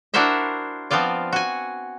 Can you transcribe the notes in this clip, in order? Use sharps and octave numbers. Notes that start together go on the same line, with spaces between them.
D4 E4 F#4 A#4 C5 E5
F3 B3 C4 F4 D5
F#4 G#5